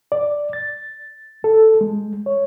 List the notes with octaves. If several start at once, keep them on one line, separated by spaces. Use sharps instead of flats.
D5
A6
A4
G#3
C#5